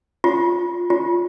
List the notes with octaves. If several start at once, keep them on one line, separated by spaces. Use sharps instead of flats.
F4
F4